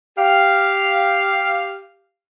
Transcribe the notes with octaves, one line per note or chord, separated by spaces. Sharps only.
G4 F5